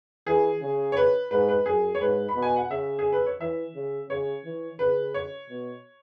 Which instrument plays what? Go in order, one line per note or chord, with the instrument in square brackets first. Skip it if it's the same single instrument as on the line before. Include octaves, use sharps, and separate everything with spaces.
[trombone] E3 [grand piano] G#4
[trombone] C#3
[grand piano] C#5
B4
[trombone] G#2 [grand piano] B4
[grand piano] B4
[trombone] F#2 [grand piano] G#4
[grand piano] C#5
[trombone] G#2 [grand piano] B4
[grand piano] B5
[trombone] B2
[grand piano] G#5
F#5
[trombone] C#3 [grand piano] E5
[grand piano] G#4
B4
C#5
[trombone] E3 [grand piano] E5
[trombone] C#3
[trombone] C#3 [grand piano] C#5
[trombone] E3
[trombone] C#3 [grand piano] B4
[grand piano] C#5
[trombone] B2